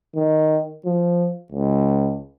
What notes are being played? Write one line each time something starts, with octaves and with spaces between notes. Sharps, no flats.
D#3
F3
C#2